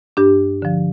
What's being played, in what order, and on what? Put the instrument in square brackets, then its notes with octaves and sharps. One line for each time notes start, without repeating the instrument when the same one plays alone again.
[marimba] G2 D4 G4
D3 F3